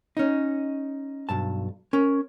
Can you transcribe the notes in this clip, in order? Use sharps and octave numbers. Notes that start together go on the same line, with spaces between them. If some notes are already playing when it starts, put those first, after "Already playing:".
C#4 D#4
B1 G2 A5
C#4 A#4